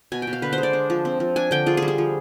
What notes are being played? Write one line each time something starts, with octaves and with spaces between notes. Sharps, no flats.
B2 G#5
G5
B2
F5
D3 B4
C5
G#3
D5
D4
F3
C4
F3
D4 G#5
D3 G5
F4 G#4
G#4
G3
G#4
F3